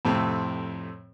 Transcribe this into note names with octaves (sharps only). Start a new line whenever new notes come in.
F2 A2 C3 A3 C4